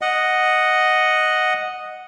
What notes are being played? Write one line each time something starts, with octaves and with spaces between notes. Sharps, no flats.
D#5 F#5